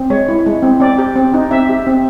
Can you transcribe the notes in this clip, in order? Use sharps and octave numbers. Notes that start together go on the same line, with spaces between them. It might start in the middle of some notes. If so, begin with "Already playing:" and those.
Already playing: C4
G#3 C#5
E4
G#3
C4
C4 D5
G4
C4
D#4
C4 E5
G4
C4